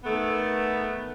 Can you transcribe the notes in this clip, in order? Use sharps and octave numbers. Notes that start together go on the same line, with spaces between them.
D#3 A3 B3